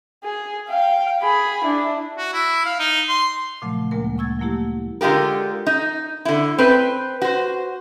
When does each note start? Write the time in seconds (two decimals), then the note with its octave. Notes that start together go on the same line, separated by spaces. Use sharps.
0.24 G#4
0.68 F5 G5
1.22 G#4 B5
1.64 D4 E4
2.18 F#4
2.33 E4
2.66 F5
2.80 D#4
3.09 C6
3.62 A#2 C#3 F3 F#3 A3
3.91 D2 A#2 G#3 A#3 A#4
4.16 D2 A#3 C#6 E6 G#6 A6
4.40 F#3 A3 A#3 E4 G4
5.01 D3 G#3 F4 G4 A#4
5.67 D#4
6.25 D3 E4
6.58 C4 B4
7.22 F#4 C5